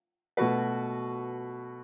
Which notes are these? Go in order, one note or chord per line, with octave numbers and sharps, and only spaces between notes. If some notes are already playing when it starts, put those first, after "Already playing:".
B2 A3 F#4 B4